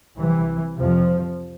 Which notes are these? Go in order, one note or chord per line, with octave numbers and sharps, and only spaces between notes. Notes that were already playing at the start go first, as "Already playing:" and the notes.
C2 C3 E3
F2 C3 F3